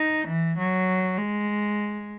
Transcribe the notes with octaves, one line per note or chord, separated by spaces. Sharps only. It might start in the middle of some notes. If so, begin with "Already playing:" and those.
Already playing: D#4
E3
F#3
G#3